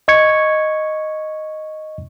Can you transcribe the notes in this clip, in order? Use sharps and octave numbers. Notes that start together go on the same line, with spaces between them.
D#5 C#6 G#6 C#7